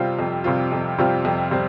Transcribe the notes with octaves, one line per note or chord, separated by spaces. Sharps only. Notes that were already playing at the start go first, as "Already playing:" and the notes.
Already playing: C3 G3 C4 F4
F2
C3 G3 C4 F4
F2
C3 G3 C4 F4
F2
C3 G3 C4